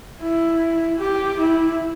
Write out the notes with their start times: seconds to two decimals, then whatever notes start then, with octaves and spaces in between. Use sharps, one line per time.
0.22 E4
0.99 G4
1.38 E4